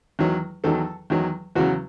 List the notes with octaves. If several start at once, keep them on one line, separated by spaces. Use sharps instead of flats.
E2 D#3 F#3
E2 D#3 F#3 A4
E2 D#3 F#3
E2 C#3 F#3 F#4